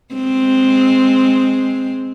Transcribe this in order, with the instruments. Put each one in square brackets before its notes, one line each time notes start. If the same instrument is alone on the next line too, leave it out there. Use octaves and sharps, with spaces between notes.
[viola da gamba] G#3 C4